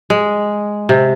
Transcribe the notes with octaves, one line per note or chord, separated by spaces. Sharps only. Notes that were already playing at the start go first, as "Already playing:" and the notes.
G#3
C3